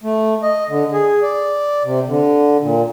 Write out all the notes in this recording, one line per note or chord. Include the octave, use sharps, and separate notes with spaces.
A3
D#5
D3
G#4
D5
C3
D3
A#2